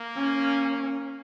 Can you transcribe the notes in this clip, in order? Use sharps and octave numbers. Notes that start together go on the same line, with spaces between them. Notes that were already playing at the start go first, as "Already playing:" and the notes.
Already playing: A#3
C#4